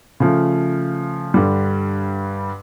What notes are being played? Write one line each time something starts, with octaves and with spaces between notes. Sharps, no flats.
C#3 F3 A3
G2 D3 G3